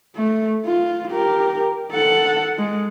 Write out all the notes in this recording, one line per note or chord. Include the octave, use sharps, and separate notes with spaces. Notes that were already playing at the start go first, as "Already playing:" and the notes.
A3
F4
G4 A#4
A4 F#5
G#3